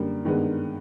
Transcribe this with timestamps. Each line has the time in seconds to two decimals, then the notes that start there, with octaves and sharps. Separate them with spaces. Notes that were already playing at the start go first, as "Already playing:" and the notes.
Already playing: F#2 D3 G3 A#3
0.25 G2 D#3 G#3 B3